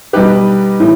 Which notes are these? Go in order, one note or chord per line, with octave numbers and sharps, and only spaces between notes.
B2 G3 D#4 G4 B4
A2 E3